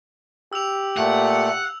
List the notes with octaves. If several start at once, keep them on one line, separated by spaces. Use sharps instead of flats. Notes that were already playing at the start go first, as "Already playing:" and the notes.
G4 E6 F7
A#2 A3 F#5